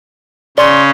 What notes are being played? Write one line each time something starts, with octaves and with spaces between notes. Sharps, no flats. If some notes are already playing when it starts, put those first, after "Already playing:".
C#3 C#4 D5 C6